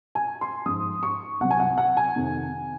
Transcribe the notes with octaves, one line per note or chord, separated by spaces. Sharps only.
G#5
C6
G#2 F3 D#6
C#6
C2 C3 F#3 F#5
G#5
F#5
F#5
G#5
F2 C3 D#3